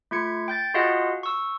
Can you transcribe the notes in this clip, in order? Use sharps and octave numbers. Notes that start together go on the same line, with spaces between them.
A3 F4 G#6 C#7
G5 G6 A6
F4 F#4 G#4 D#5 F5 F#5
C#6 E6